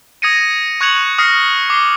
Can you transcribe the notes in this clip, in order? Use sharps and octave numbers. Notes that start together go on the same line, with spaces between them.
D#6 G#6 A#6 C#7 D#7
C#6 F#6 G#6 C#7 F7 F#7
D#6 F6 A#6 C7 C#7
D6 C7 G7